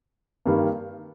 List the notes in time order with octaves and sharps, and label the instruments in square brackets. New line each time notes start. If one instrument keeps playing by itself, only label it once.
[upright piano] G2 D#3 G3 A#3